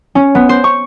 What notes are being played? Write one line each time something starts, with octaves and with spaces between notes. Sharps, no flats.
C#4
B3
C5
C#6